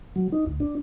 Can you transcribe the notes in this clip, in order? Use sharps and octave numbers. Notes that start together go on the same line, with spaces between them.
F#3
D#4
D2
D4